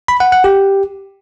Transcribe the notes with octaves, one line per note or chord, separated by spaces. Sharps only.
B5
F#5
F#5
G4